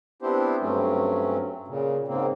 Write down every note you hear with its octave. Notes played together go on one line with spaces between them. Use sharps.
B3 C4 D4 E4 G4 C5
G2 F#3 A3 C4 C#4
A#2 C#3
G#2 C#3 A#3 C4